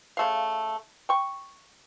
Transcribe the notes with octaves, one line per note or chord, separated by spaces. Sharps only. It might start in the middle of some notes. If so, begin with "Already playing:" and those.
C#3 A3 F5
G5 C#6